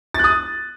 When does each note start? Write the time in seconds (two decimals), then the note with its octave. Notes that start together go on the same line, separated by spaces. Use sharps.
0.14 A6
0.19 F#6
0.24 D#6